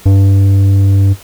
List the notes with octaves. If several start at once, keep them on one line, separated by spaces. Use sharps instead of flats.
G2